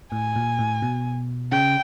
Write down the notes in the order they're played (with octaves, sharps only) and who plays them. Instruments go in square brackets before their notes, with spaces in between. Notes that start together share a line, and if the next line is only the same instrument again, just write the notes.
[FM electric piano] A2 [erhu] G#5
[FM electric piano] A#2
A2
B2
[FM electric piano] C#3 [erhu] G5